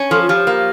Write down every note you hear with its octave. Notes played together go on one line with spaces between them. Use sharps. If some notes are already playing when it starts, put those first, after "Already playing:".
Already playing: C#4
F3 A4
F4
F3 G4
A#3